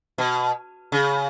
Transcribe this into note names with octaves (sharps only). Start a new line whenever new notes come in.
B2
C#3